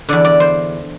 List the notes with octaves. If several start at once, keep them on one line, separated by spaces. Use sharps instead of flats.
E2 D3 D5
D5
C5